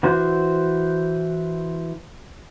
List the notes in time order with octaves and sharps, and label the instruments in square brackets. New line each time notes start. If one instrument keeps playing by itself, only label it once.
[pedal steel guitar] E3 F#4 C5